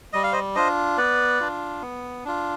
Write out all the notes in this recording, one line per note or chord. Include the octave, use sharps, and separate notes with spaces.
G3 D#5
F5
C5 D#5
D4 F4 C5 D#5
B3 B4 D5
D4 F4
B3
D4 F4